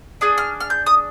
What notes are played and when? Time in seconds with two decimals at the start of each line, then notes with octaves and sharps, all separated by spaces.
0.21 D4 G#4 D#6
0.38 F6
0.60 F6
0.70 G6
0.86 D#6